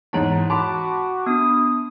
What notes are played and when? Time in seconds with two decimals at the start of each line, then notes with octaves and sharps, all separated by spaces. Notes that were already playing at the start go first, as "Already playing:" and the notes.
0.13 E2 G#2 D#4 C#5 A5
0.50 F#4 A5 B5 C6 D6
1.26 B3 D4 D#6